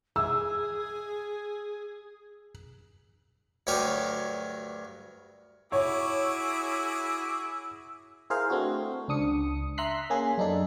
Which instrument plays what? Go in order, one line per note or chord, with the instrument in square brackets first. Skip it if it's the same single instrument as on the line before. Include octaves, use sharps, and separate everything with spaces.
[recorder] G#4 [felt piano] E6
[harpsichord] D2 G2 F#3 G4 A#4 G#5
[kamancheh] E4 [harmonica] F#4 G#4 D6 [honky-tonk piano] C#5 [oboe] E6
[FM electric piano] E4 G#4 A#4 C5 F5
A3 C4 D4 F#4
C#2 D4 D#6 C#7
E5 A#5 C6 F#6 B6 C7
A#3 C#4 G#4
F#2 D4 D#4 A4